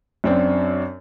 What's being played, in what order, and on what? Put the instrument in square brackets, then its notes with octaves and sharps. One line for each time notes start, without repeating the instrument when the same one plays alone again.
[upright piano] F#2 C4 D4